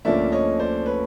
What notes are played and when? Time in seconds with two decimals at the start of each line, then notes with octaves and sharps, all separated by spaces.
0.05 D2 D3 F3 A#3 C#4 D5 E5
0.32 C#5 D#5
0.59 C5 D5
0.86 B4 C#5